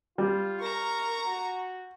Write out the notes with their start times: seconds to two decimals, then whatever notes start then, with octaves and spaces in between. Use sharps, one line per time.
0.18 G3 F4
0.61 A#4 A#5 C#6
1.26 F#4